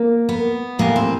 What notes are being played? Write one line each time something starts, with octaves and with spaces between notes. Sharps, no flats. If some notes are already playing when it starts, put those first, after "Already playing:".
Already playing: A#3
B3
A2 E3 G3 A#3
C4